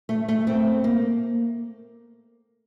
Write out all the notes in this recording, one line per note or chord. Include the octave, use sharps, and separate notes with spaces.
A3
A3
A3 C4
A#3